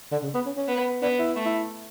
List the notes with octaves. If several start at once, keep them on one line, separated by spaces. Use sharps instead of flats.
D3
C#3
B3
C#4
C#4
B3
B3 D4
E4
A3
E4